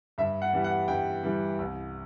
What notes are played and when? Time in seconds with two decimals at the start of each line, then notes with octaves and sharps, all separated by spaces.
0.18 G2 E5
0.42 F#5
0.53 E3 G3
0.64 F#5
0.88 G2 G5
1.23 E3 G3
1.59 C2